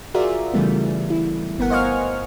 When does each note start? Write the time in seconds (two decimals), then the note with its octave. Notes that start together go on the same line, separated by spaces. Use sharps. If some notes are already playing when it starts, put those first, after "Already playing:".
0.14 F4 F#4 G#4 A#4 D5 E5
0.53 C#3 E3 G3 A3 B3
1.10 E4
1.58 G1 B3 A#4 F#5
1.70 C5 D#5 F5 G#5 C#6 F6